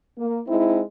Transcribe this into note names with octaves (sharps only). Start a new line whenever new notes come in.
A#3
G#3 C4 D#4 E4